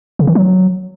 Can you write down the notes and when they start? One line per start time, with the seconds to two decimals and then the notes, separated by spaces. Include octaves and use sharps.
0.19 C#3
0.27 D#3
0.35 F#3